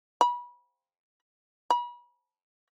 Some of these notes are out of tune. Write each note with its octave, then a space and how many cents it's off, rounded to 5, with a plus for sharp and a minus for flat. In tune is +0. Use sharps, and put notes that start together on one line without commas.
B5 -25
B5 -35